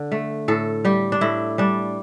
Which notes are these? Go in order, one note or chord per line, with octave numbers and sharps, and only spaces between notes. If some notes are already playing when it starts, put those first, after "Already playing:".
Already playing: D3
A3
A2 A4
G3 G4
D4
A2 E4
G3 D4